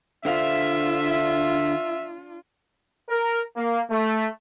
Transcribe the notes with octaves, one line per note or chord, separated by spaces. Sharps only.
D3 D4 F4 C5 E5 F5
A#4
A#3
A3